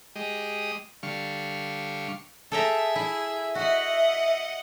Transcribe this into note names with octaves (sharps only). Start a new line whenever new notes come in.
G#3 G4 D#5
D3 G3 F5 C#6
G#4 A4 E5 G5 A#5
E4
F#4 D#5 E5 F#5